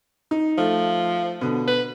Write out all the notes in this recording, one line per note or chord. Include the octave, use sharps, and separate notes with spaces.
D#4
F3 A3
B2 D3
B4